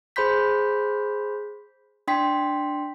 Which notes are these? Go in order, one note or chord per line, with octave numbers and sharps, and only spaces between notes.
G#4 C5 B5 C6 G6 B6
D4 G5 C6 B6